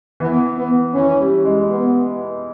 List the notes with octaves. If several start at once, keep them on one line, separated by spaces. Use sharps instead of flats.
E3 B3
B3
E3 C#4
G3
G#3
B3